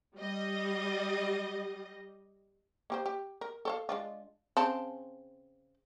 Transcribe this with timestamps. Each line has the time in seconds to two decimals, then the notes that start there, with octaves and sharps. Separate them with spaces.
0.16 G3 D#5
2.90 A#3 G4 C5
3.06 G4
3.41 A#4
3.65 A4 C#5 F5
3.89 G#3 D4 F4
4.57 C#3 C4 A5